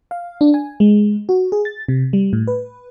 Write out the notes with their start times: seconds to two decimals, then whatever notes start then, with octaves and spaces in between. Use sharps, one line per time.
0.11 F5
0.41 D4
0.54 G#5
0.80 G#3
1.29 F#4
1.52 G#4
1.65 A6
1.88 C3
2.13 G3
2.33 A2
2.47 B4